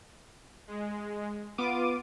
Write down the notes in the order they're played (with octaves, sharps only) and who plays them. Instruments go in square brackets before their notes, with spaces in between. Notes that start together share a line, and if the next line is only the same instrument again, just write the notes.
[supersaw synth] G#3
[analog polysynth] B3 D6 D#7 [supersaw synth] F4